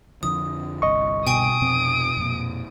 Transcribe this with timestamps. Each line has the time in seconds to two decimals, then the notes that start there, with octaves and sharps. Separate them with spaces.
0.23 F2 D3 F3 D#6
0.82 G1 C2 D#5 C#6
1.27 B2 G5 G#5 C#6 D#6 D7
1.61 F2 C3 C4
2.17 F2 A#2